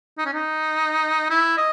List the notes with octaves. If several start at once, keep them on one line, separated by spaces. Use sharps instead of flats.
D#4
C#4
D#4
E4
D#5